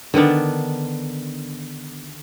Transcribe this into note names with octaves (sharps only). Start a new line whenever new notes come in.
D3 D#3 B3 D4